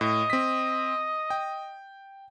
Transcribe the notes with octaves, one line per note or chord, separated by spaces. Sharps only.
A2 D#5
C4 B6
G5